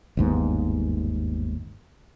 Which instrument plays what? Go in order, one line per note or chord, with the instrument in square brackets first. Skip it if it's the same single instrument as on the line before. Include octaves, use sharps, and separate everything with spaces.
[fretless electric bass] G1 D#2 G#2 B3